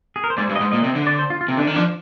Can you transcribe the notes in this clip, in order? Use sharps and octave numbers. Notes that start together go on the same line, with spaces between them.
G#4
A#4
C5
G#2 D5
G2
D#5
G#2
A#2 D#5
C3
D3
D5
C5
F4
F4
C3
D3 D4
D#3
F3 D4